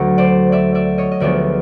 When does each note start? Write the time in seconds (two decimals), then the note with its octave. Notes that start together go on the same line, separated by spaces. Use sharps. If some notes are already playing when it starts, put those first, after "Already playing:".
Already playing: D2 D3 F#3 A3
0.18 C5 D5
0.52 D5 E5
0.75 D5 E5
0.98 C#5 D#5
1.12 D#5
1.20 D2 D3 F3 G#3 B3 D5 E5